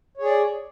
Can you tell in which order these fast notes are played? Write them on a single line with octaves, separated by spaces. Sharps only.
C#5 G#4 D5